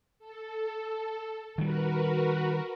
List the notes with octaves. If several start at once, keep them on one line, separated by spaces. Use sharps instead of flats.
A4
D#3 G3 F#4 A#4 B4